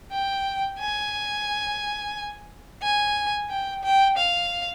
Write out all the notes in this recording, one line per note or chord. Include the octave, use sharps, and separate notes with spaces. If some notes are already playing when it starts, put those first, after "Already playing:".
G5
G#5
G#5
G5
G5
F5